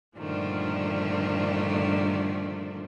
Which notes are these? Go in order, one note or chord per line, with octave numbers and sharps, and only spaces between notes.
G2 A#2 D3 D#3 F3 A3